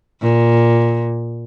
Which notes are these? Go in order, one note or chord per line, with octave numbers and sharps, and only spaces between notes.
A#2